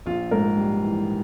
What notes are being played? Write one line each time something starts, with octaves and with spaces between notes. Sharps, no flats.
A#1 F4
G#2 A#4
G3
E3